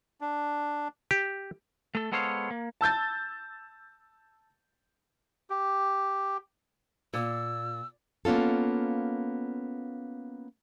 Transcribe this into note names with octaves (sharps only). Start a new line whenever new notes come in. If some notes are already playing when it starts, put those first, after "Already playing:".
D4
G4
A3 A4
G#3 B3 A4 C5 C#5 F5
A#3
A5 E6 G6 A6
G4
A#2 E6
A#3 B3 C#4 F4 A4